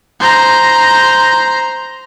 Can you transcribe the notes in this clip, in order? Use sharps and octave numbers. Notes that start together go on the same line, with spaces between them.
C5 A#5